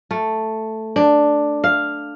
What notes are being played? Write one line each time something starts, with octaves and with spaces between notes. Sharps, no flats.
A3
D4
F5